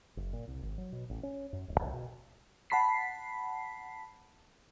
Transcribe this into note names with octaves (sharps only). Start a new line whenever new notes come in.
F#1
A#2
C2
G#1
F#3
B2
A1
C#4
F#2
D1
C2
B2
F#5 A5 B5 B6 C7